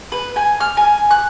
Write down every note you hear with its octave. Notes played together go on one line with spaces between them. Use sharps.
B4
G#5
F6
G#5
F#6